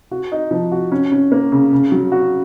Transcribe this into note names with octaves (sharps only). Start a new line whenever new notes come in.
F#4
D#4
F3
F#4
C#4
C#4
A#3
C#3
C#3
F#3
F#4